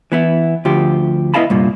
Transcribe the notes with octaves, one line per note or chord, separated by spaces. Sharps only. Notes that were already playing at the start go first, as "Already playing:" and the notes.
E3 B3 E4
D2 F3 G4
B3 E4 D#5 F5 A5 B5
C2 G2 A#2